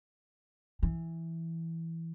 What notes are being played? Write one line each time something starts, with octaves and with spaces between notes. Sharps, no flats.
E3